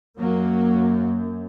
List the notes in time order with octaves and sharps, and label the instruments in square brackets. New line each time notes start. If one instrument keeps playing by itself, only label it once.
[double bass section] F#2 F#3 A#3